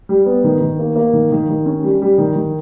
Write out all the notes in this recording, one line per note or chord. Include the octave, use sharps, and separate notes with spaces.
G3
B3
D#3
D#3
A#3
A#3
D#3
D#3
D#3
C#4
G3
G3
D#3
D#3